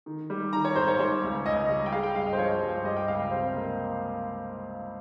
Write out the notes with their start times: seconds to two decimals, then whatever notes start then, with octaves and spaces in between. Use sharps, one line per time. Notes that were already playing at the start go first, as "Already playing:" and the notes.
0.06 D#3
0.30 G3
0.53 D#3 A#5
0.65 C#5
0.76 G#2 C5
0.88 C#5
0.99 G3 C#5
1.23 C#2
1.45 C#2 D#5
1.69 G3
1.86 G5
1.92 G#3 F5
2.03 G5
2.15 G2 F5
2.26 D#5
2.33 C5
2.38 F3 C#5
2.61 G2
2.84 G3 D#5
2.96 G5
3.08 C#2 F5
3.20 F5
3.31 C3 C5
3.54 A#3